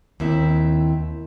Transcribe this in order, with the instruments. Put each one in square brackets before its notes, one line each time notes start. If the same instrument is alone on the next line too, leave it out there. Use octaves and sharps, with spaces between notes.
[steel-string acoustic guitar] D#2 C4 E4 E5